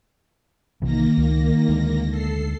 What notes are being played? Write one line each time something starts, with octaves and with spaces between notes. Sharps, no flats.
B1 C3 D#3 E3 A#3 A#6
C#2
D2 G#3 D4
A4 C7